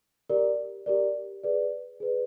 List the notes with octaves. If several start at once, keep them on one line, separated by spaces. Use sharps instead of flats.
G4 A#4 D5
G4 A#4 D5
G#4 B4 D5
G#4 B4 D5